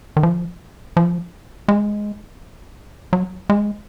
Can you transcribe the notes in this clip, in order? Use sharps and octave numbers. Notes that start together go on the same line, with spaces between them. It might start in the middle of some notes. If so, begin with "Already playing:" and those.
D#3
F3
F3
G#3
F#3
G#3